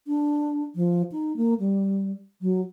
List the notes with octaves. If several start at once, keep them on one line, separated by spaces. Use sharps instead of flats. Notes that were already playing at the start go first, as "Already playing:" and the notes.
D4
F3
D#4
A#3
G3
F#3